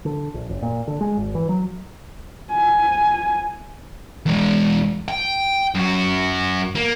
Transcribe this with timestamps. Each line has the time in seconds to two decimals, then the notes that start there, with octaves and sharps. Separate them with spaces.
0.05 D3
0.34 A#1
0.49 F#1
0.62 A#2
0.88 D3
1.01 G#3
1.17 G#1
1.35 E3
1.49 F#3
2.53 G#5
4.26 E2 G#3
5.08 G5
5.74 F#2 F#4
6.75 A#3